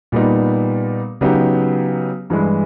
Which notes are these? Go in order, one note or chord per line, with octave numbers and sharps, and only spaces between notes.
A#2 G3 B3 D#4
C#3 F#3 B3 D#4 G4
G2 E3 G#3